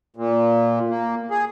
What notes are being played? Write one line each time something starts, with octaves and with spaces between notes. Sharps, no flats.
A#2
A#3
G#4